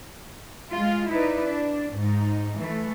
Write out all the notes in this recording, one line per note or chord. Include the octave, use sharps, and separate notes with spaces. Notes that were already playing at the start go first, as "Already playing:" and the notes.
G#3 F4
D#4 E4 B4 D5
D4
G#2 D#4
E3 A3